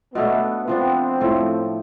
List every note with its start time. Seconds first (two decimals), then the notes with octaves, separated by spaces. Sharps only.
0.15 B2 A3 B3 D4
0.68 F3 B3 C4 D4
1.20 A2 F3 A3